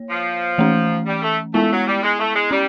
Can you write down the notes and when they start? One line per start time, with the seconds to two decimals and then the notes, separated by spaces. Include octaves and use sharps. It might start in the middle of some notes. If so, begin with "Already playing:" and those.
Already playing: A#3 C#5
0.10 F3
0.58 E3 A3 C#4
1.06 G3
1.22 A3
1.54 G#3 A3 B3 E4
1.71 F#3
1.87 G3
2.03 G#3
2.20 A3
2.35 G#3
2.51 G3 C#4